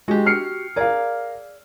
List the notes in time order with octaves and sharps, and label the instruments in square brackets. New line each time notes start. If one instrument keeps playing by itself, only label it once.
[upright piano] G#3 [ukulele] F#4 G4
[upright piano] F6 C7 C#7
[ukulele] G#4 D5 [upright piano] A#4 F5